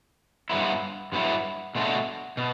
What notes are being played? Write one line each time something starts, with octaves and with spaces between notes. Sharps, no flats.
G2 F#3 B3 E4
G2 F#3 B3 E4
B2 A3 D4 F#4
B2